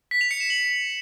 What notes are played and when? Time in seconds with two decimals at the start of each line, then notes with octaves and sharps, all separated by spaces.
0.11 B6
0.21 F7
0.31 C#7
0.40 E7
0.50 F#7